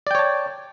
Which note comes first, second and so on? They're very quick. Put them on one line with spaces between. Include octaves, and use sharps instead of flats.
D5 G5 C#5 A5